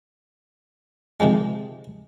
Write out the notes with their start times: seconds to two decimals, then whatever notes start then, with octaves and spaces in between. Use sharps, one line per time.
1.20 C3 D#3 F3 G#3